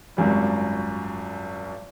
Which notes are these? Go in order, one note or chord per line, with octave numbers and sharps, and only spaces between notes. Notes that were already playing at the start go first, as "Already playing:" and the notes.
G#1 C#2 F#2 G3